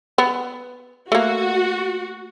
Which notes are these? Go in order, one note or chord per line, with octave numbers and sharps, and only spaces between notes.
B3
A3 A#3 F#4